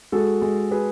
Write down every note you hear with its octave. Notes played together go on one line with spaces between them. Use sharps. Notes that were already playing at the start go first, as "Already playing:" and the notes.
G#3 F#4 A4
G#3
G#4 B4